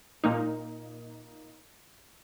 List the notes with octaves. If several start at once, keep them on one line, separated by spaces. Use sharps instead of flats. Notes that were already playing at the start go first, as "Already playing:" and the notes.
A#2 A#3 D#4